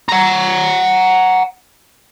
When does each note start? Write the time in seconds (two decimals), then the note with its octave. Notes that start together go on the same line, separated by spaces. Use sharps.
0.09 F#5 A#5